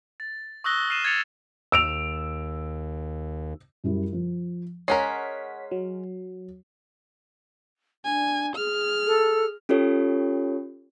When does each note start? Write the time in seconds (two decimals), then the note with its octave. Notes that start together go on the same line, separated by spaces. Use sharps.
0.20 A6
0.64 C#6 D#6 E6 F#6 A#6 G7
0.90 F6 C7 D#7 E7
1.05 G#6 A6 C#7 F7
1.72 D#2 E6 D7 F7
3.84 F#2 G3 E4
4.13 F3
4.88 G#3 C#4 A#4 C#5 F#5 B6 C7
5.71 F#3
8.05 D4 G#5
8.56 G#4 F6
9.07 A4
9.69 C#4 F4 G4 A4 C#5